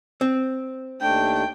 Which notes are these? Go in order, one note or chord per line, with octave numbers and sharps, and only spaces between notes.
C4
D#2 A3 D4 G5